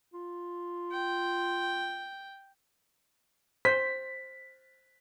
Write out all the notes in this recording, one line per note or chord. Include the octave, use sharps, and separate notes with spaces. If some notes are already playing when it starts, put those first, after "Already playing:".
F4
G5
C5 B6